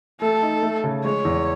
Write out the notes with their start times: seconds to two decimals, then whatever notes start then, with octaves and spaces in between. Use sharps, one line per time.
0.21 A3 A4
0.42 D#4
0.63 A3
0.84 C#3
1.04 G#3 C#5
1.25 E2